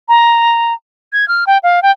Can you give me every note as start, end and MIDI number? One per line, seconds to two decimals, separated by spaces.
0.09 0.73 82
1.13 1.28 92
1.28 1.44 89
1.47 1.58 79
1.63 1.82 77
1.83 1.91 79